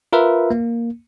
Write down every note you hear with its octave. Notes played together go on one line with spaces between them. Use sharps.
F4 A#4 B4 E5
A#3